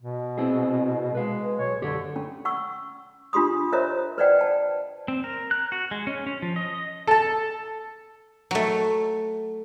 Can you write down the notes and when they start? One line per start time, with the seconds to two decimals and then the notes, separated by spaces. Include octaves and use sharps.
0.02 B2
0.38 C4 E4 G#4
1.15 G#3 B4 F5
1.59 B1 C#5
1.82 F#2 D3 G4 C#5
2.16 C#4
2.45 F#5 C#6 E6
3.33 D4 F4 G4 C6 D#6
3.72 A#4 C5 C#5 D#5 E5 A#5
4.18 B4 C5 D5 D#5 F#5 G5
4.39 G5 A5
5.08 C4
5.24 A#4
5.51 F#6
5.72 F#4
5.91 G#3
6.07 C#4
6.26 C#4
6.42 F3
6.56 D#5
7.07 A4 A5
8.51 F#3 A3